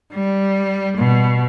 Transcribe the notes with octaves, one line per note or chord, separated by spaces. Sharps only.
G3
B2